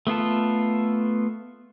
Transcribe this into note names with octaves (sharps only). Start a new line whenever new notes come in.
A3 B3 F4 A4